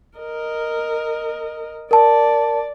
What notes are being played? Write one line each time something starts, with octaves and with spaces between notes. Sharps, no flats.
A#4 D#5
A#4 D5 A5